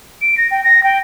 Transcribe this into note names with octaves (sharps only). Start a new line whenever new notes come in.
D7
A#6
G5
A#6
G5